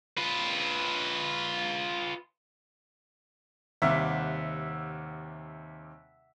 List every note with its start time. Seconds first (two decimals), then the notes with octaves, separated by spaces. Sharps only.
0.17 F4 B4
3.82 D#2 C3 G3 E5 F#5 D6